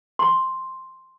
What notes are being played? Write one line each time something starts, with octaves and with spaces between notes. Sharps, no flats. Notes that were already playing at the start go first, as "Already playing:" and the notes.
C6